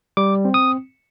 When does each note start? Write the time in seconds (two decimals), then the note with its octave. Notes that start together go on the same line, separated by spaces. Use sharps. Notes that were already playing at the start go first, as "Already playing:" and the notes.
0.17 G3 D6
0.45 C4
0.54 D#6